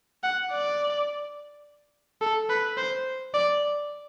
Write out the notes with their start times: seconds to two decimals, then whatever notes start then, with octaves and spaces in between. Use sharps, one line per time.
0.23 F#5
0.51 D5
2.21 A4
2.49 B4
2.77 C5
3.34 D5